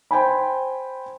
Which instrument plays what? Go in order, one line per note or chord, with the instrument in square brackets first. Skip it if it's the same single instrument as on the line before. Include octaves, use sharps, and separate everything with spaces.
[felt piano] C5 G5 G#5 B5